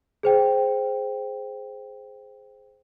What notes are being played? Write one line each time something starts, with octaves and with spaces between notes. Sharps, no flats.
G#4 C5 G5